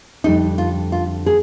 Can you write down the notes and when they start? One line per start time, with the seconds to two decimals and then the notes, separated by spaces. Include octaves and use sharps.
0.24 F2 D3 G3 D#4
0.58 F4
0.92 F4
1.26 G#4